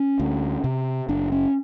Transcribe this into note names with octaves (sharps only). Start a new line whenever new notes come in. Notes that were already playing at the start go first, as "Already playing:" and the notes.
Already playing: C#4
D2
C3
F#1 D4
C#4